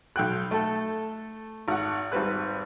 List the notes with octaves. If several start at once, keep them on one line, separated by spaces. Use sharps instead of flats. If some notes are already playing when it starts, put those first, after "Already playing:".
B1 G5 F#6
A3 A4
G#1 F#5
G#1 G3 C4 B4 F#6